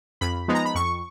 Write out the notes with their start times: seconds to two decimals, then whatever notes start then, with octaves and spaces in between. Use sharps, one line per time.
0.21 F2 B5
0.48 F3 G#3 B3 D#4
0.55 A#5
0.65 B5
0.75 F2 C#6